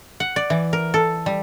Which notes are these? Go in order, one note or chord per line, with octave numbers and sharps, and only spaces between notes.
F#5
D5
E3
A#4
A4
G3